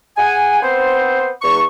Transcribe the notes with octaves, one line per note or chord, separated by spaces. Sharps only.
G#4 F#5 G#5
B3 C4 C5
E2 C#6